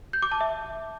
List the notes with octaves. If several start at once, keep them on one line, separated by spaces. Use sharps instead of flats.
G6
D6
A5
E5